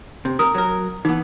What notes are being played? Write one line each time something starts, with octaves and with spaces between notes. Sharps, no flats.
C3
A#4 D#6
F#3 A#4
E3 B3 D#4